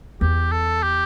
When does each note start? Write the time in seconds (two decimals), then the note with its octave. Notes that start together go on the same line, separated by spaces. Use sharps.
0.21 E2 G4
0.52 A4
0.83 G4